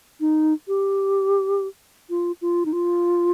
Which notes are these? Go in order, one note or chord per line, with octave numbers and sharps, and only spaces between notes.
D#4
G4
F4
F4
D#4
F4